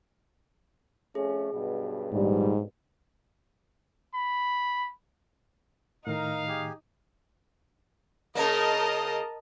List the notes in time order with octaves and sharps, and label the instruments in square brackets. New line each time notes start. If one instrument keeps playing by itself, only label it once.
[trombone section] F2 A3 C#4 [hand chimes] G#4
[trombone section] B1 G2 B2
[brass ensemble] A#1 D#3 G3 [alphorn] G#2
[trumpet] B5
[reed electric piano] A2 D#3 [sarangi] D#4 [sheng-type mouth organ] A#4 [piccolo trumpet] F5
[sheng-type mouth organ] G4 G#4
[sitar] C#3 A#3 [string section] A#4 D#5 A5